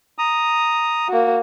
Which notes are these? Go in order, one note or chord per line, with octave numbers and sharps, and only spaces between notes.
A#5 D#6
A#3 F#4